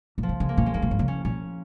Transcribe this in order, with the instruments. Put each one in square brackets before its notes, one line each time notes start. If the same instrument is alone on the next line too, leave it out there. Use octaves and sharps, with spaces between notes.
[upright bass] A#2
[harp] F3
[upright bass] C#3
[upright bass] C#3 [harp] G#3
[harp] A#3
[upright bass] A#2 [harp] C#4
[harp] G#3
[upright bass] G#2 [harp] A#3
[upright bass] A#2
G#2
C#3
[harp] C#4
[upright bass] A#2 [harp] C#4